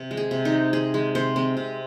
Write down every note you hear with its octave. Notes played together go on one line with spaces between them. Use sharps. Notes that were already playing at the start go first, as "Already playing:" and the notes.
Already playing: C3
G#3
G#4
C3
D#4
G#3
C3 G#4
G#3
C3 C5
G#3 C4
C3